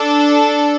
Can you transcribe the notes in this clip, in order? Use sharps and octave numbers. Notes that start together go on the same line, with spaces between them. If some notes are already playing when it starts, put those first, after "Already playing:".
Already playing: D4 A4